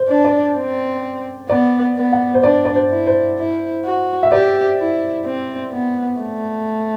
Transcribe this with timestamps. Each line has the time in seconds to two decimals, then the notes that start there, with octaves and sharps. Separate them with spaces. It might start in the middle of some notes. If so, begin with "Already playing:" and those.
Already playing: C5
0.08 D4
0.25 D5
0.56 C4
1.49 B3 D5
1.97 B3
2.12 F#5
2.34 C5
2.43 D4 D5
2.65 D5
2.75 C5
2.90 E4
3.07 C5
3.38 E4
3.85 F#4
4.23 E5
4.32 G4 D5
4.78 E4
5.26 C4
5.72 B3
6.20 A3